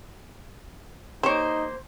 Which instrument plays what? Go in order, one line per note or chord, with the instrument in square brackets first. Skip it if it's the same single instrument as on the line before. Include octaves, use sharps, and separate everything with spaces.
[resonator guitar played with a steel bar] A#3 C5 [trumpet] D#4 [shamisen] G4 C#5